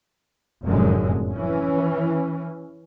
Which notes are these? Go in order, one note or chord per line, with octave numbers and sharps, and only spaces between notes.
F1 F#2 A2 D3 G#3
E3 C#4